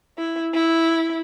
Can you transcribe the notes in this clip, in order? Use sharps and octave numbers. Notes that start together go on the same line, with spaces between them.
E4
E4